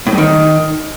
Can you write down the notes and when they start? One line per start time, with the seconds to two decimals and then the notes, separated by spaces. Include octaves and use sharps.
0.07 A2
0.12 G2
0.18 D#3